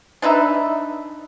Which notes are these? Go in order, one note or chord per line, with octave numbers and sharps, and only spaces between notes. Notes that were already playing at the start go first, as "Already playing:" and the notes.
D4 D#4 B4 E5